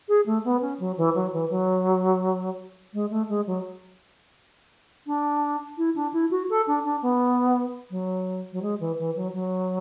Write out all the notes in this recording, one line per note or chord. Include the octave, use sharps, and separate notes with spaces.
G#4
A3
B3
C#4
F#3
E3
F#3
E3
F#3
G#3
A3
G#3
F#3
D4
E4
D4
E4
F#4
A4
D4
D4
B3
F#3
F#3
G#3
E3
E3
F#3
F#3